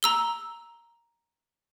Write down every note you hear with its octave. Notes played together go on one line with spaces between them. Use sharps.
A#5 E6 G7